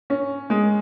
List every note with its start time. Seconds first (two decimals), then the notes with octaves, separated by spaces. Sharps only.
0.10 C#4
0.50 G#3